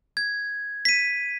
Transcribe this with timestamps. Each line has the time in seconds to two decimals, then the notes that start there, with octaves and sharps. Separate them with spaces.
0.17 G#6
0.85 B6 D#7